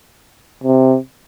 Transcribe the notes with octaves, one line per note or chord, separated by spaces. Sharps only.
C3